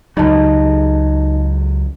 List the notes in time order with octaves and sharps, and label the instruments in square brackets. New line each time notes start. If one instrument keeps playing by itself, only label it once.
[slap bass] C#2 F#3 [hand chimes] D#4 D#5 A5